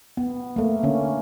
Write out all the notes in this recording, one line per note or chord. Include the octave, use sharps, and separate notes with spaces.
B3
A3 A#3
D3 A#3 C#4